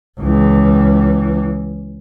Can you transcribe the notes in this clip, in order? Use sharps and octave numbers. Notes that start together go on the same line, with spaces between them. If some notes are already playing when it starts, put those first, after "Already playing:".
C#2 E3